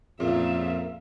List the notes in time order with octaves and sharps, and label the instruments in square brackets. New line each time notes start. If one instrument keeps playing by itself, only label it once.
[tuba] F2 [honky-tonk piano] A#2 C#3 [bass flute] A#4 [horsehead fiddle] E5 F5